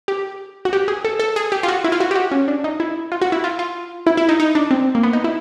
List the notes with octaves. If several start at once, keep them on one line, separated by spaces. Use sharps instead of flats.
G4
F#4
G4
G#4
A4
A4
G#4
G4
F4
F#4
E4
F4
F#4
G4
F#4
C#4
D4
D#4
E4
F4
F#4
E4
F4
F4
E4
E4
D#4
D#4
D4
C4
A#3
B3
D#4
E4